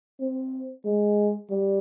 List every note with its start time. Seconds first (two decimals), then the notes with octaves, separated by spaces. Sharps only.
0.20 C4
0.85 G#3
1.50 G3